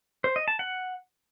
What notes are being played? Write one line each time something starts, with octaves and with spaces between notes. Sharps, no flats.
C5
D#5
A5
F#5